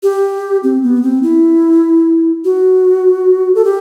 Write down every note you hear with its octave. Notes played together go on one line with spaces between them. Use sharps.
G4
C4
B3
C4
E4
F#4
A4
G4